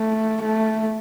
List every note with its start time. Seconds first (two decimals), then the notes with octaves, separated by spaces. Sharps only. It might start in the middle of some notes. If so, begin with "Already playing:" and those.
Already playing: A3
0.42 A3